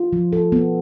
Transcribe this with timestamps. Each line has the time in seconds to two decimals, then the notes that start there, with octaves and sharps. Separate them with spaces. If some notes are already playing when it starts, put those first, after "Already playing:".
Already playing: F4
0.13 F3
0.33 A4
0.52 B3